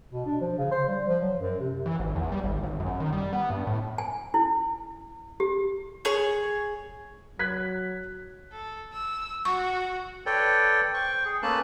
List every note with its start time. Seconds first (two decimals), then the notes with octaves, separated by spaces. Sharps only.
0.13 B2
0.26 D4
0.41 F3
0.58 C#3
0.71 C5
0.88 G3
1.08 F3
1.21 F#3
1.38 F#2
1.60 C3
1.86 E3
1.99 G#1
2.16 E2
2.32 G3
2.44 G#1
2.63 G#1
2.80 F#2
3.00 D#3
3.13 G3
3.33 B3
3.50 G2
3.67 A2
3.98 G#5
4.34 E4
5.40 G4
6.05 G#4 C#5
7.39 F#3 F#6 G#6 B6
8.52 A4
8.93 E6
9.45 F#4 C#6
10.26 A4 B4 C#5 D5 G5
10.94 C5 G5 C#6
11.25 G#4
11.43 A3 A#3 C#4 B4 A5 F#6